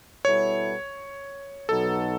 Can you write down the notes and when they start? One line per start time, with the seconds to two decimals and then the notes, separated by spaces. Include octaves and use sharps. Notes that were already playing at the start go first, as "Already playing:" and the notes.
0.25 B2 G3 B3 E4 A4 C#5
1.69 B1 B2 F#3 B3 D#4 A4